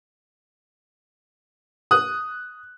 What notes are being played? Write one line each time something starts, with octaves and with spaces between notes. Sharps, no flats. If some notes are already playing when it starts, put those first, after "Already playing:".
D#6 F#6